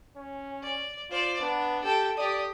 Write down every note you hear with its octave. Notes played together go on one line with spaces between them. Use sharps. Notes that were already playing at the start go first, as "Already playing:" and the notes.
C#4
D5
F4 C5 D5
B3 D4
G4 A4 G5
G4 D5 D#6